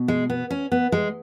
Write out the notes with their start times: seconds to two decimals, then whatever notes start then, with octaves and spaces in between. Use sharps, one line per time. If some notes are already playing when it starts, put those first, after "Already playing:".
Already playing: B2
0.08 G#3
0.30 B3
0.50 C#4
0.72 B3
0.92 G#3